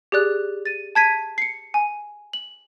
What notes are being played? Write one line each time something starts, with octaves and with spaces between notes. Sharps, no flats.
G4 G#4 D5 F#6
A6 D#7
A5 G#6 B6 D#7
C7 C#7
G#5
F#7